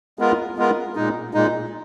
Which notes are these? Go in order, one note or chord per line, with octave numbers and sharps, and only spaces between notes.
G#3 B3 F4 A#4
G#3 B3 F4 A#4
A#2 G#3 D#4
A#2 G#3 D#4